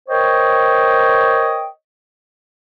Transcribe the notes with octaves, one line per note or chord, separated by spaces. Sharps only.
A#4 C5 C#5 D#5 G5